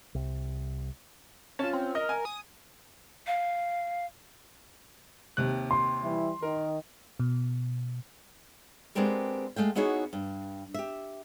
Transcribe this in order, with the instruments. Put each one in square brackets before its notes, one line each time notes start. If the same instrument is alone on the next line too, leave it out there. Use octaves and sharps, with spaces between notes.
[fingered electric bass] C2
[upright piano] C#4 F4 [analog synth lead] A5
[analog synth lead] C4
[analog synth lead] A#4 [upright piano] D#5
[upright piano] G#5
[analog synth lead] D#6
[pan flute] F5
[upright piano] D#2 C3 F#6
[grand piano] C6
[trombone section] E3 G3 E4
[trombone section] D#3 [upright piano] A#4
[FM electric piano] B2
[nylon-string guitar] G#3 B3 C4 D4 G4 A#4
G#3 A3 F5 G5
B3 D#4 E4 F#4 G#4 C#5
G2
G4 E5